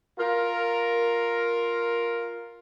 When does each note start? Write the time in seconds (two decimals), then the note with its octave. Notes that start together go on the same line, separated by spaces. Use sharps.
0.19 F4 A#4